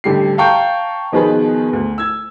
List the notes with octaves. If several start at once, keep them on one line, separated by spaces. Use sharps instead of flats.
A1 D3 G3 G4 C7
F5 G5 A5 A#5 C#6 G6
B2 D#3 F3 B3 G#4 B4
D2
E6 G#6